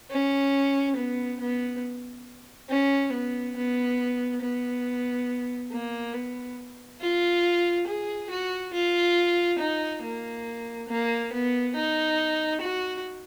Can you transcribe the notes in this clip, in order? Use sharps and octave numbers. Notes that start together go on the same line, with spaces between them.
C#4
B3
B3
C#4
B3
B3
B3
A#3
B3
F4
G#4
F#4
F4
D#4
A#3
A#3
B3
D#4
F#4